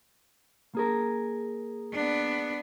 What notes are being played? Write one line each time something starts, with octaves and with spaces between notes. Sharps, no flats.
A#3 G#4 A#4
B3 D4